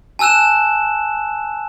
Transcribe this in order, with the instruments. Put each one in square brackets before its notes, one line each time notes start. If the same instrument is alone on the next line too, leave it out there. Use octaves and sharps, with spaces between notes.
[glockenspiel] G#5 A5 E6 F#6 E7